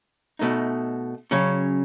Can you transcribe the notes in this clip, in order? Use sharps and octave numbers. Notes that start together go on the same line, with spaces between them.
B2 A3 D#4
C#3 F#3 C#4